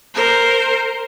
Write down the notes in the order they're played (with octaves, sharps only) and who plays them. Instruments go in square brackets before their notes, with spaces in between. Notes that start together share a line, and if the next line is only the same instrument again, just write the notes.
[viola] A#4 C5